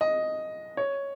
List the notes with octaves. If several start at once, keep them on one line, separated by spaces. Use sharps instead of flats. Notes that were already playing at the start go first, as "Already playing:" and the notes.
D#5
C#5